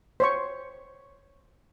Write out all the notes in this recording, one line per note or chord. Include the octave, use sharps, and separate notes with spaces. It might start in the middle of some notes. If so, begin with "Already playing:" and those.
C5 C#5 C#6